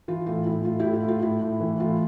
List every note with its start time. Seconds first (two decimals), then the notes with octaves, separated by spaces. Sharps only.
0.08 E3 F4
0.27 A2 F4
0.46 A2 E4
0.65 A2 F4
0.80 A2 E4 G4
0.93 F4
1.03 A2 F4
1.22 A2 E4
1.42 A2
1.60 E3
1.79 A2 F4